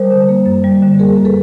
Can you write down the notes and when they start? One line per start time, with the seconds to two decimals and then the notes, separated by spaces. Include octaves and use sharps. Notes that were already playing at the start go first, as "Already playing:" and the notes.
Already playing: G3 A#4 C5
0.11 D3
0.29 A#3
0.46 F#2
0.64 G3
0.82 D3
0.99 A#3 G#4 A#4
1.16 F#2
1.25 A4 B4